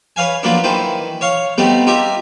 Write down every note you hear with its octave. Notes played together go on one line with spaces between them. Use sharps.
B4 C#5 F5 G#5
F3 F#3 A#3 B3 D4
D#3 E3 B4 C5
C#5 F5 C#6
G3 A3 B3 C4 D#4
D#4 F4 G4 E5